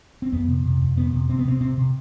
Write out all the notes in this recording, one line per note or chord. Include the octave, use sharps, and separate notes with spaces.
C4
F2 B3
C3
C3
F2
C3 B3
C3
C3 C4
B3
C3 C4
C3 C4
C3